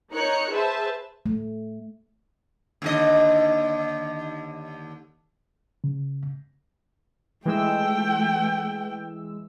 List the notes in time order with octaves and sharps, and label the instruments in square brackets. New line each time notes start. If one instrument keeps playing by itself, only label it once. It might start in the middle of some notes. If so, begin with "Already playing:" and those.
[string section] D#4 A#4 C#5 F#6 C#7
G#4 B4 C5 E5 A5
[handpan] A3
[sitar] D#2 D3 D#5
[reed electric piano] C#3
[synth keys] E3 G#3 E6 [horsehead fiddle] A3 G5